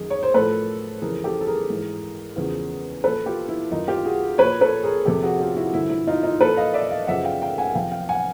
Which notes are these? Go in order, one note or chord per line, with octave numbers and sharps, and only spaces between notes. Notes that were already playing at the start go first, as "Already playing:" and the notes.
Already playing: F#2 D#3 G#4
C#5
C5
A2 F3 A4 B4
F2 C#3 E3 G#4 A#4
G4 A4
A4
G#4 A#4
G#2 E3
E2 C#3 F3
A#2 F3 A4 B4
F4 G4
E4
F#2 D#3 D#4 F4
F4 G4
F#4 G#4
A#2 F3 B4 C#5
A4 B4
G#4 A#4
F2 C3 F3 G4 A4
F#4 G#4
F4 G4
E4 F#4
G2 D3 F3 E4
E4
D#4 F4
D#4 F4
A#2 F3 A4 B4
D#5 F5
D5 E5
D#5 F5
F#2 C#3 F3 E5 F#5
F5 G5
F5 G5
F#5 G#5
F2 C3 F3 F5 G5
F5 G5
F#5 G#5